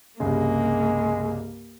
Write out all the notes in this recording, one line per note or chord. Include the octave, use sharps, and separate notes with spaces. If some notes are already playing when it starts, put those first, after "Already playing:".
C2 G2 C#3 G#3 A#3